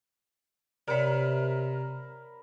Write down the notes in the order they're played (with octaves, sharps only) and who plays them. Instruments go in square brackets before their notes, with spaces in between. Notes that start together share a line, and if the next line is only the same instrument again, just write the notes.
[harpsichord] C3 [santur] A#4 B5 [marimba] C#5 D5